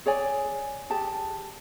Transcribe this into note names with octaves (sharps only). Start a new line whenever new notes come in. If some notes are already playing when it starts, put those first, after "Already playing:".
G#4 C#5 D5 G#5
G4 G#4 A5